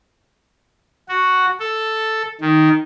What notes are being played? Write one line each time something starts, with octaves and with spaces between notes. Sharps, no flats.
F#4
A4
D#3